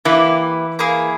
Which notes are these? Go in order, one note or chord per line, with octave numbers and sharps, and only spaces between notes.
E3 A#3 E4 G4 B4
A#3 E4 G#4